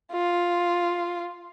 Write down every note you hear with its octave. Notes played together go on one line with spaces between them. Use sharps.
F4